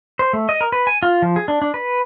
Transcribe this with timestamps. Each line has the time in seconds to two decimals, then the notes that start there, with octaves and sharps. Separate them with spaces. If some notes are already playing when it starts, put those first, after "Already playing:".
0.19 C5
0.33 A3
0.49 D#5
0.61 A#4
0.72 B4
0.87 G#5
1.03 F4
1.22 F3
1.36 G#4
1.48 D4
1.62 D4
1.74 B4